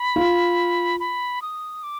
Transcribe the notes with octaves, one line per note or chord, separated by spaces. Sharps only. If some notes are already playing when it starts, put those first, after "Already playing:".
Already playing: B5
F4
B5
D#6
D6